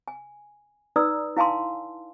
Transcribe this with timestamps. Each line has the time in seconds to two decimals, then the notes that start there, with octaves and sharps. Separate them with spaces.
0.08 G#5
0.96 D#4 B4 D5 A#5 D#6 E6
1.37 E4 F5 G#5 A5 C6